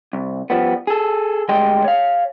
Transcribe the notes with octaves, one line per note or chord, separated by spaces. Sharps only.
C2
F3 G3 B3
G#4 A4
D2 G3 G#3 D#5 G5 C6
C#5 F5